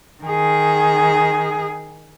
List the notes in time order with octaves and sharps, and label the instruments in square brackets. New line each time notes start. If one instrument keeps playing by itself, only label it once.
[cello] D#3 G#4